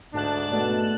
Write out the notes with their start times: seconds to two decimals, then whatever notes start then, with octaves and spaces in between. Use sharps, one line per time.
0.14 D2 G#2 D4 A5 F#6
0.52 B2 A3 B3 D5